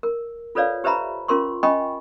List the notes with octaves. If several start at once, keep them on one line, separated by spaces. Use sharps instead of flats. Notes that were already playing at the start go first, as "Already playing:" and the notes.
A#4
F4 A4 B4 C#5 D5 F5
G4 B4 C5 E5 A#5 B5
C#4 F4 A#4 C6 C#6
C#4 D#5 G5 G#5 B5 C#6